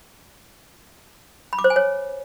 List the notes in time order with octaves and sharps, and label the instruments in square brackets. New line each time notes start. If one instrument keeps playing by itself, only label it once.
[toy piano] B5
D6
C5
G#5
C#5